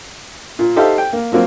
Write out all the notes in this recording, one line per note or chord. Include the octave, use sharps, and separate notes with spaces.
A#2
D#4 G4 A4 C5 E5 F5
G5
A#3
F3 F#3 A#3 C4